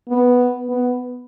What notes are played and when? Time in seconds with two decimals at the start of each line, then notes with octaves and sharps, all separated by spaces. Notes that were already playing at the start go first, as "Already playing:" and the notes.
0.09 B3
0.69 B3